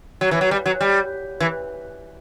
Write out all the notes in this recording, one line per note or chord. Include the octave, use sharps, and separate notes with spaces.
F#3
E3
F#3
G3
F#3
G3
E3